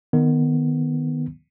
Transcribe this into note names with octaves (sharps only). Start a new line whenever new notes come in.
D#3 B3